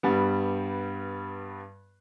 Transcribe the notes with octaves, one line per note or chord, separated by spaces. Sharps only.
G2 G3 B3